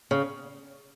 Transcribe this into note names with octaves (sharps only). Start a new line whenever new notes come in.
C#3